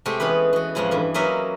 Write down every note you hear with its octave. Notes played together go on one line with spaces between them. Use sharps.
C3 G#3 A3 G4
E3 B3 C#4 G#4 B4
E3 F#4
F2 A2 F3 G#3 E4
G2 E3
F#3 A#3 C#4 B4 D#5 E5